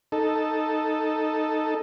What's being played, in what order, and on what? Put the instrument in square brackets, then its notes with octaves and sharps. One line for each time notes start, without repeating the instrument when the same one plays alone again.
[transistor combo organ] D#4 A4